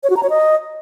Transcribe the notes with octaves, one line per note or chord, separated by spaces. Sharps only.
C#5
F#4
A#5
C#5
D#5